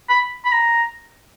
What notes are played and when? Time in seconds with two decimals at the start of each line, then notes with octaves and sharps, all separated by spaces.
0.09 B5
0.45 B5
0.52 A#5